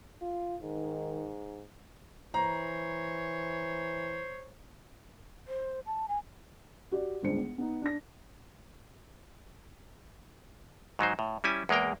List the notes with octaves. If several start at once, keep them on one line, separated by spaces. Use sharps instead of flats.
F4
G#2 D#3
E3 C5 C#5 A#5
C5
A5
G#5
F#4 G4 D5
G1 C#2 D4 G#4 C5 C#7
B3
B3 D#4
D4 A#6
G#2 F#3 D#4 C5
A2
G3 C#4 E4 G#5
E2 G#3 A#3 A#4 G5